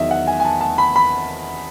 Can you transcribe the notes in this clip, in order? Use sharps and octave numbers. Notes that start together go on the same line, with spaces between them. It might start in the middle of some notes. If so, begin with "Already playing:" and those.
Already playing: E2 D#3 F#3 D#5 E5
F#5
G#5
G#5
A5
A5
B5
B5